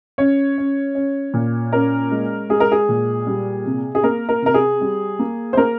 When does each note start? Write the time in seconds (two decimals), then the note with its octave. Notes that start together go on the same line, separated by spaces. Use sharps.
0.18 C#4 C#5
0.58 C#4
0.95 C#4
1.34 A#2
1.72 C#4 A#4
2.11 G#3
2.49 G#3 G#4
2.60 A#4
2.72 G#4
2.89 A#2
3.27 G3
3.66 C3
3.95 G#4
4.03 A#3 A#4
4.29 A#4
4.42 C3 A#4
4.54 G#4
4.81 G3
5.19 A#3
5.53 C5
5.57 A#3 A#4